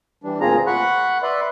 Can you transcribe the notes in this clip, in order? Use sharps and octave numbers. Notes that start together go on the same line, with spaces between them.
E3 G3 D4
D2 A#2 C4 F4 G#4 A#5
F#5 B5 C#6 F#6
B4 D5 E5 B5 C6